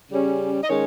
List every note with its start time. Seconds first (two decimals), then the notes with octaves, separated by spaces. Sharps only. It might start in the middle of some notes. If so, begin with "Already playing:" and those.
0.11 C#3 G3 C#4
0.63 D#5
0.70 D#3 G#3 C#4 C#5